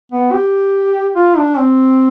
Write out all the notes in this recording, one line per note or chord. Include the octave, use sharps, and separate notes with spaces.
B3
G4
F4
D4
C4